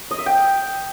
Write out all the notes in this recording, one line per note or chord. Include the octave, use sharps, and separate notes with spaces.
D#5
E5
G5